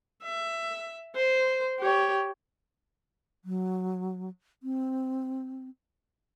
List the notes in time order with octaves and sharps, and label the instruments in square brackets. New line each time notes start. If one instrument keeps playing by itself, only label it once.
[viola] E5
C5
G4 C#5
[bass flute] F#3
C4